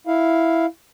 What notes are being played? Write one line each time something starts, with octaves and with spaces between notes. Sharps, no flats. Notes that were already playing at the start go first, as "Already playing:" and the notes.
E4 F5